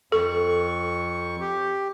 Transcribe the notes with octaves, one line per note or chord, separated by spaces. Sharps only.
F2 A4 C#6
G4